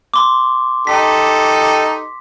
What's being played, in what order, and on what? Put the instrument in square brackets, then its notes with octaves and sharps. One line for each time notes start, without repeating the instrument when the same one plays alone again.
[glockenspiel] C6 D6
[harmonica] D#4 G4 A4 [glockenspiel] B6